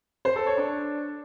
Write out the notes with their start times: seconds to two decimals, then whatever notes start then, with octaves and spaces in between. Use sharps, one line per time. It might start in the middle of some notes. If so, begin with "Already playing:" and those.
0.25 C5
0.36 A4
0.46 C#5
0.57 D4